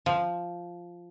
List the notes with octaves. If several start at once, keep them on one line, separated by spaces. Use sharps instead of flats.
F3